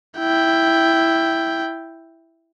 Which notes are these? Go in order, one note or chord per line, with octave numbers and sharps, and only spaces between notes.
E4 G5